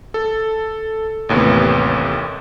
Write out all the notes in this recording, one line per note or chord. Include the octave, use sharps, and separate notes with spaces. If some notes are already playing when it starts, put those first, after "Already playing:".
A4
A1 D#2 A2 C3 B3